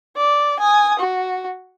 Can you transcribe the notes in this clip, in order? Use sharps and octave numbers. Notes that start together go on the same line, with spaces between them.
D5
G#5 D#6
F#4